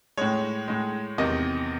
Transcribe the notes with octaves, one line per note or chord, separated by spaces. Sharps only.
A2 G#3 C#5
A2 G#3
E2 C3 D#3 D#5